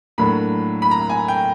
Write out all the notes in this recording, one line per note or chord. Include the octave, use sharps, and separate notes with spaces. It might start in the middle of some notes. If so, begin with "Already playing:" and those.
A2 F#3 A#3 D4 B5
B5
A#5
G#5
G5